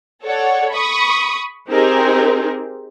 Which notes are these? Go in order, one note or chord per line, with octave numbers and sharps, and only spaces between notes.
A4 C#5 D5 F#5
B5 C#6 D#6
C4 D#4 G4 G#4 A#4